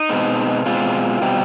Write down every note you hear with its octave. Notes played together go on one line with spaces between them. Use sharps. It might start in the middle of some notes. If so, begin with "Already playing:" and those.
Already playing: D#4
B2 G#3 C4
B2 G#3 C4 F4
B2 G3 C4